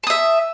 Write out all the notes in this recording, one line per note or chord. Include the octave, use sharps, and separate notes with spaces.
E5 A5 D#6